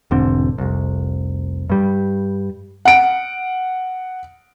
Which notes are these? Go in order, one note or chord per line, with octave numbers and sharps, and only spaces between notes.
E1 G#2 D3 C4
F1 C2
G2 G3
F#5 D7